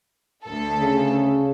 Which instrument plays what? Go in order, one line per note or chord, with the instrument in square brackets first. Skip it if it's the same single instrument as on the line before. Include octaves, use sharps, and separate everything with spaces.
[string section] D2 A4
[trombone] C#3